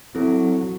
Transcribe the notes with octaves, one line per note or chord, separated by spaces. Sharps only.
F#3 C4 E4 A4